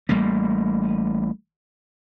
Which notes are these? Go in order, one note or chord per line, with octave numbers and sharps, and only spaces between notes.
A1 G3 A3 A#3